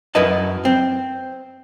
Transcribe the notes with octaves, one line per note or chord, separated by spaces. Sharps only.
F#2 E4 A#4 B4 D#5 A5
C4